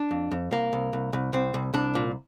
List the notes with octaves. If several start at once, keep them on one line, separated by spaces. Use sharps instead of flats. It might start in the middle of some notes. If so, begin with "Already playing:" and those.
Already playing: D4
F2
F2
C2 A#3
C2
C2
C2
C2 C4
C2
C2 D4
A#2